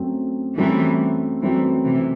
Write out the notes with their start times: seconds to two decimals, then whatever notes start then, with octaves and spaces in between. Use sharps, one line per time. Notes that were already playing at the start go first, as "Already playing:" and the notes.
Already playing: F#2 F#3 A3 C4
0.57 F#2 E3 F#3 G3 A3 C4
1.42 F#2 E3 F#3 G3 A3 C4
1.85 C3 E3